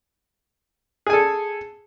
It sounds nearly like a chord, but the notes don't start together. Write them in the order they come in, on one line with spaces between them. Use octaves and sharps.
G#4 G#5 A4